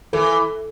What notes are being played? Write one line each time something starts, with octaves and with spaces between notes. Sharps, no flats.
E3 A4